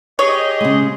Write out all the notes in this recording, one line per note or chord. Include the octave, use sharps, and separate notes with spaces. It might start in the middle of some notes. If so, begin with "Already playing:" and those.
G4 G#4 C#5 D#5
C#3 G#3